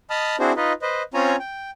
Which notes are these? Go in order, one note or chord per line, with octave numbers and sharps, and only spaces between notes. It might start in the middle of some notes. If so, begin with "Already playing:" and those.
D#5 A5 B5 D#6 F6
C4 D4 E4 F#4 G#4 C5
D#4 F4 B4 D#5
B4 C5 D#5
C4 C#4 F4 C#5 G#5 A#5
G5